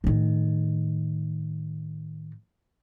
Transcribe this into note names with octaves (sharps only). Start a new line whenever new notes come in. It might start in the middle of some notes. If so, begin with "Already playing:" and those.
A2 D#3